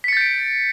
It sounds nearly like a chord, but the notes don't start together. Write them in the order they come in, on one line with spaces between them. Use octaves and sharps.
B6 C#7 A6 G6 D7